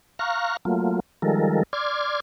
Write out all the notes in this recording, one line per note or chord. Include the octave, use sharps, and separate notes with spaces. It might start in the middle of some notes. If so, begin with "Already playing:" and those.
F5 A#5 C#6 F6 F#6
F#3 A3 A#3 F4
D#3 F3 G3 G#3 A4 A#4
D5 C6 D6 F6 G#6